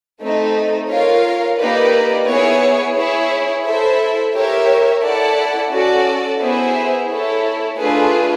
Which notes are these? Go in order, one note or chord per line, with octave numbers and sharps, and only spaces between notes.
A3 C4 D#4
F4 A#4 C#5 F5
A#3 D#4 G4 B4 D5
B3 E4 G#4 C#5
E4 G#4 C#5
E4 A4 C5 E5
G4 A#4 C#5 E5
E4 A4 D5 F#5 A5
C#4 F#4 A4 D5
B3 E4 G#4 C5 E5
E4 A4 C#5
A3 D4 F4 G#4 B4